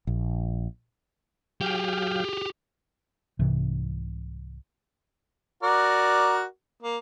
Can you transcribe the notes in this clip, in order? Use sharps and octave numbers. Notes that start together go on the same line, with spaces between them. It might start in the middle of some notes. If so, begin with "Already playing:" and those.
A#1
F#3 G4 G#4 F5 G5
C2 G#2 C3 E3
F#4 A#4 D5
A#3